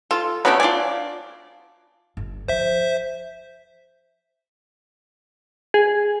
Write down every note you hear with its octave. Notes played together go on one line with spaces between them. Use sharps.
F4 A4
F#3 A3 B3 C#4 D4
D4 F4 D5 G#5
G1
F3 C5 E5
G#4